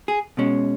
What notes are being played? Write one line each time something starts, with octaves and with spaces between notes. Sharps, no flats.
G#4
B2 G#3 C#4